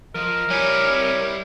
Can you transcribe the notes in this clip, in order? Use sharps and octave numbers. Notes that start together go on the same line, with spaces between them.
F3 A#4 D#5
G3 C4 E4 C#5 G#5